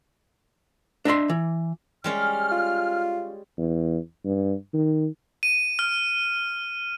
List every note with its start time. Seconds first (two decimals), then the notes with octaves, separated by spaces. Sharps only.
1.05 D4 D#5 E5 C6
1.29 E3
2.04 G3 G#3 C#4 F6
2.51 F4
3.58 E2
4.24 G2
4.74 D#3
5.43 D#7
5.79 F6